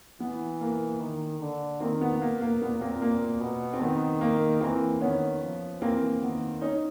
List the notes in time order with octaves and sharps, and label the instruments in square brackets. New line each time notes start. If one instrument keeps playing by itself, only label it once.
[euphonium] E3 [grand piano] B3
[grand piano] A#3
[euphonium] D#3
D3
[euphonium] D#3 [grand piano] A#3 C4
[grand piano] B3
A#3
A#3
[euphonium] A#2 [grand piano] B3
[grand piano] A#3 C4
A#3
[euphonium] B2
[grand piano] C4
[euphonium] D#3 [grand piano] B3
[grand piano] A#3
[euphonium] E3 [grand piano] A#3 C4
[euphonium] D#3 [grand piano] B3 C#4
[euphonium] F3
[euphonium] E3 [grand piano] A#3 C4
[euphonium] D#3 [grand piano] B3
[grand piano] C#4 D#4